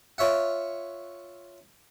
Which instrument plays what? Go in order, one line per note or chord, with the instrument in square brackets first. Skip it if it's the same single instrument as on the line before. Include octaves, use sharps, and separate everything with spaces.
[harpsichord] F4 C#5 E5 F#5